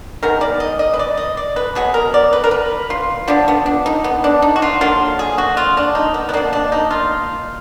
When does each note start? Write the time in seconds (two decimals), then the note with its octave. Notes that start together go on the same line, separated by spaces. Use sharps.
0.23 D#3 G#3 B3 A#4
0.41 D5
0.60 D#5
0.79 D#5
0.94 B4
0.99 D5
1.17 D#5
1.37 D5
1.56 B4
1.75 B2 F#3 B3 G#4
1.94 A#4
2.14 D5
2.33 B4
2.44 A#4
2.51 B4
2.90 F4
3.28 F3 B3 D4
3.48 B3
3.66 D4
3.86 D#4
4.04 B3
4.24 D4
4.42 D#4
4.56 F#4
4.62 F4
4.81 D3 F#3 A#3 F4
5.19 G#4
5.38 F#4
5.57 F4
5.77 D4
5.95 D#4
6.14 B3
6.29 B3
6.33 B2 A#3 D4
6.53 D4
6.72 D#4
6.91 F4